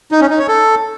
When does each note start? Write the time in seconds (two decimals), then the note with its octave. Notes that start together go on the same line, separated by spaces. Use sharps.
0.12 D#4
0.21 C#4
0.30 D#4
0.39 C#5
0.48 A4